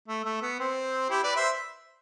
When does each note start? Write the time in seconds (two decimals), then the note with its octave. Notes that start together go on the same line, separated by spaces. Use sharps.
0.08 A3
0.25 A3
0.42 B3
0.60 C4
1.10 E4 G4
1.23 B4 D5
1.36 C5 E5